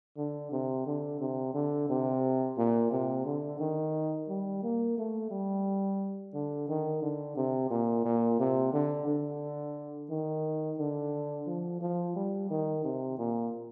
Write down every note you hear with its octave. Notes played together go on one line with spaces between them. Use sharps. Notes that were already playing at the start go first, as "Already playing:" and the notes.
D3
C3
D3
C3
D3
C3
A#2
C3
D3
D#3
G3
A#3
A3
G3
D3
D#3
D3
C3
A#2
A#2
C3
D3
D3
D#3
D3
F3
F3
G3
D#3
C3
A#2